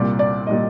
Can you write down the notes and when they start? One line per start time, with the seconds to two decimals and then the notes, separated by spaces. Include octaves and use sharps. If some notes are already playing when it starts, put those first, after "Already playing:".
Already playing: C2 A#2 G3 D5
0.19 D5
0.47 A#2 G3 D#5